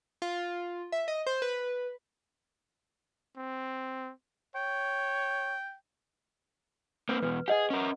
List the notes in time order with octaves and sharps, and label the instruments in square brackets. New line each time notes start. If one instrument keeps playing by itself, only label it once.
[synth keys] F4
E5
D#5
C5
B4
[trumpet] C4
[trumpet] C#5 [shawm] G5
[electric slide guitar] A#3 C4 [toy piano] B4
[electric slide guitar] E2 B2 [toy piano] B4
[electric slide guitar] G4 G#4 [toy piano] D#5 F#5
[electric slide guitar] C#4 A#4